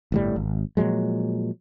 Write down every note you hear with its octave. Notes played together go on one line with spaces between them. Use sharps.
G1 A2 G3
G#1
A#2 F3 F#3 G#3